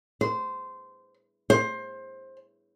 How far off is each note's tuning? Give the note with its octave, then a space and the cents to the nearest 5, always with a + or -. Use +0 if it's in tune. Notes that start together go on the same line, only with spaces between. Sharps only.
C5 -15
C5 +20